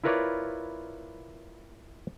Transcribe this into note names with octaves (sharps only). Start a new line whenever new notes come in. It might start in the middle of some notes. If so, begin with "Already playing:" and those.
E4 F4 A#4 B4 C#5 D5